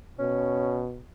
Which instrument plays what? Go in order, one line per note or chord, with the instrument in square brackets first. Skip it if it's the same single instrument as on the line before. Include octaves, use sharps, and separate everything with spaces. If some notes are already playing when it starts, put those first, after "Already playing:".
[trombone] B2 [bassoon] C#4